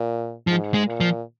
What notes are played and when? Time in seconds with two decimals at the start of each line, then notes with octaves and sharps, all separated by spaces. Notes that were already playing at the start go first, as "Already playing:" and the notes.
Already playing: A#2
0.47 G#2 F3
0.74 G#3
0.87 A#2
1.00 F3